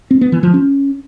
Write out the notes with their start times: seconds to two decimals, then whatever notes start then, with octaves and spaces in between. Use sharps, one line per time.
0.11 C4
0.21 B3
0.32 E3
0.43 F3
0.54 C#4